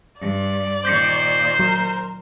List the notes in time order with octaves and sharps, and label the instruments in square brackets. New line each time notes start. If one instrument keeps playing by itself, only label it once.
[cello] G2 [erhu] D5
[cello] A#2 D#3 [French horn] C5 [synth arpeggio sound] G6 C#7
[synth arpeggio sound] F#3 [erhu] A#4